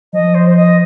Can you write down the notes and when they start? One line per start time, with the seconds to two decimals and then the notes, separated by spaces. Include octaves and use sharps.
0.13 F3 D#5
0.35 C5
0.49 C5
0.57 D#5